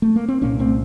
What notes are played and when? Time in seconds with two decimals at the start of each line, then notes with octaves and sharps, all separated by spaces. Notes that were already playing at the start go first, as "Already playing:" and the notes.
0.02 A3
0.16 A#3
0.28 C4
0.41 C2 A#2 A#3 C#4
0.59 A3 C4